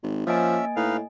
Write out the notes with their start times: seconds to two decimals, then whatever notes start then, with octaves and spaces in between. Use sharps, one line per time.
0.03 G#1
0.27 F3 A#3 C#4 D#5 E5 G#5
0.76 A2 D#4 B4 F5